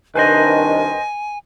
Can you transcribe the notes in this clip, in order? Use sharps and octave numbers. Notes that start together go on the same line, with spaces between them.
C2 D#3 D4 B4 C5 D#5 G#5